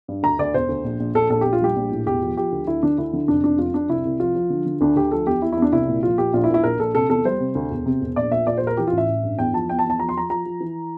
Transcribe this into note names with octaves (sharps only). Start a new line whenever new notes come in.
G2
D2 A#5
D2 D5
E1 C5
D2
A#1
A#1
A#1 A4
A#1 A4
A#1 G4
F4
G3 G4
A#1
A2
E1 G4
F3
F3 G4
D2
D2 E4
D3 D4
D2 E4
D3
F1 D4
F1 D4
F2 F4
F2 D4
C2 E4
C2
F3 F4
F3
D3
D3
D2 D4
D2 G4
F3 A4
E2 G4
E2 E4
E4
E2
D4
C2 E4
A#2
F3 F4
A#2 G4
A#1 F4
E4
A#2
E4
A#1 A#4
A#1 A4
C3 A4
E2 A4
G3 C5
C3
D2
E1
C3
E1
A#1 D5
A#2 E5
A#2 D5
C5
A#2
A#4
E3 G4
F4
A1
E5
A1
G2
E2 G5
F3 A5
E2 G5
A5
E2
A5
F3 A#5
C6
F3 A#5
F3 A#5
F3
E3